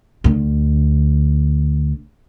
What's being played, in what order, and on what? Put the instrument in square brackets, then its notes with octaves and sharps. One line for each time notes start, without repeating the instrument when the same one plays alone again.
[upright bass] D2 D3